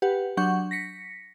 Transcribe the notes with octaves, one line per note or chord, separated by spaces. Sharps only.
G4 B4 F#5
F#3 D4 F#5 C#6 G6
A#6 B6 C#7